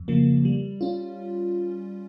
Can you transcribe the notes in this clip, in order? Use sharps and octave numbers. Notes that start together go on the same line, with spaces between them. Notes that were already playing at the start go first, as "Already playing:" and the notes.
Already playing: F2
C#3 F3 A#3
G3
C#4 F4